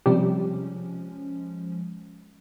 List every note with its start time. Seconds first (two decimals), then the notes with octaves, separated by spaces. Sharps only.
0.06 C3 F3 G3 G#3 C#4